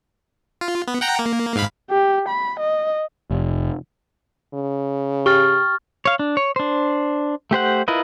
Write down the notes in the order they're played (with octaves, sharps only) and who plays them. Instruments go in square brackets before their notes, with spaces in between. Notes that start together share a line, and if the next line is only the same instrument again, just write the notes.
[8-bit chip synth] F4
B3
F#5 G5 A#5
A#3
G#2 F5 B5
[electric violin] G4
B5
D#5
[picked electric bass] F1
[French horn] C#3
[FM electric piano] G4 [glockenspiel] C#6 F6 A6
[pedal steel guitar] C#5 F5
D4
C#5
D4 C5
A3 G4 C5 F#5
E4 F4 A#4 B4 D#5